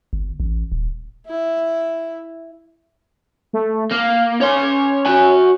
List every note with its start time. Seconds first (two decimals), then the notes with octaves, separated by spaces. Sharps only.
0.13 G1
0.40 A1
0.72 D#1
1.26 E4 E5
3.53 A3
3.91 A#3 F5
4.41 C#4 C#5 C6
5.05 F#4 G#5